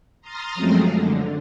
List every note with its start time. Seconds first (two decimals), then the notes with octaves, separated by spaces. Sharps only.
0.21 A#5 C6 D#6 F6 A6
0.55 F#2 F3 F#3 G#3 A3 C4
0.85 D3